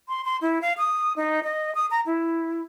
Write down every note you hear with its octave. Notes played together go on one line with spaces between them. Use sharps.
C6
C6
E4
F5
D#6
D#4
D#5
D#6
A#5
E4